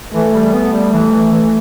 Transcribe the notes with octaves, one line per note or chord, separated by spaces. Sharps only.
E3 A3
G3
A3 B3
G3
E3
E3
E3